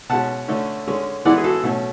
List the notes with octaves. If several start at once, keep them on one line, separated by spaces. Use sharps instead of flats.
B2 G#3 C#4 F#5 A5
D3 A3 C#4
D3 G#3 C#4
E3 G#3 B3 D5 F#5
G#4
F#4 A4
B2 F#3 A3 C#4 F#4 A4